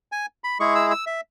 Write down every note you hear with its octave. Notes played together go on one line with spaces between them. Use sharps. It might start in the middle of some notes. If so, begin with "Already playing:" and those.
G#5
B5
G#3 E4 G#4 C#6
E6
E6
E5